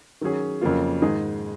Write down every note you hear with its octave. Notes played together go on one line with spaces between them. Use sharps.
D#3 F#3 C#4 G#4
F2 C#3 F#3 A#3 F4
G#2 D#3 G#3 D#4 G#4